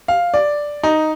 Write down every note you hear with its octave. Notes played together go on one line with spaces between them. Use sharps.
F5
D5
D#4